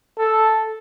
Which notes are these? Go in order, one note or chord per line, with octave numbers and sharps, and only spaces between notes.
A4